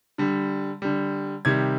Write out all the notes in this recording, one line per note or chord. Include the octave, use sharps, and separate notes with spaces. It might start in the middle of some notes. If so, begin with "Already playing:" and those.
D3 G3
D3 G3
C3 D#3 G3 G#6